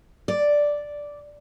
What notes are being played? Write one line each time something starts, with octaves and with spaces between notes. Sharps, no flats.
D5